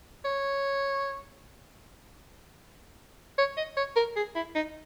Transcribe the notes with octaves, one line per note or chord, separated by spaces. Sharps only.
C#5
C#5
D#5
C#5
A#4
G#4
E4
D#4